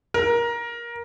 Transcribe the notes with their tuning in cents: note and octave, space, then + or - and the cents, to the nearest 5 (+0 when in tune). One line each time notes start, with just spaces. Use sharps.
A#4 +15